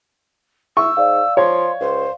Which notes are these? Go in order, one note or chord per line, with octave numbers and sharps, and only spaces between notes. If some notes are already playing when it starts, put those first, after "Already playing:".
E4 C#6 E6
G#2 D5 F5
F3 C#5 C6
C#2 C5